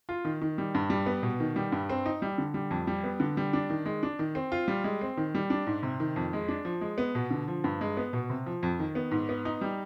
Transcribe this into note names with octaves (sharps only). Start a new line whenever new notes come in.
F4
D#3
D#3
G3
G2
G3
B3
B2
D#3
G3
G2
C4
D#4
G3
D3
G3
F2
G3
B3
D3
G3
D4
D#3
G#3
D4
D#3
C4
F4
G3
G#3
C4
D#3
G3
D4
G#2
C3
D#3
F2
G#3
D4
F3
G#3
B3
B2
D3
F3
G2
G#3
B3
B2
C3
F3
F2
D#3
B3
G#2
B3
D#4
G3